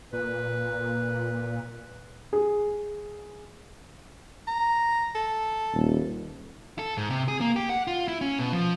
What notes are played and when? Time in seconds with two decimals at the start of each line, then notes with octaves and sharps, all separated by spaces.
0.13 A#2 B4
2.33 G#4
4.47 A#5
5.15 A4
5.74 D#1
6.79 A4
6.97 G#2
7.10 C3
7.28 G#4
7.41 A#3
7.56 G4
7.70 F#5
7.87 F4
8.08 E4
8.21 C#4
8.39 B2
8.53 F3